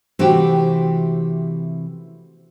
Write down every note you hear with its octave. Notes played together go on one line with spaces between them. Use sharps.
C3 E3 A3 C4 F#4 G4